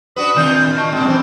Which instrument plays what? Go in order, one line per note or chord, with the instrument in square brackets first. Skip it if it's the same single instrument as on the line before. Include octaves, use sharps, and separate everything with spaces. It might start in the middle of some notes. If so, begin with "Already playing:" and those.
[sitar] D4 F#4 B4 [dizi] D#6
[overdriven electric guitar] D3 C4 [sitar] D#3 D4 F4 [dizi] G6
[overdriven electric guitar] D#5 A5 [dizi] C#6
[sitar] A#2 G#3 [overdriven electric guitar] C4 [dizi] G5
[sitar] F#2 E3 C5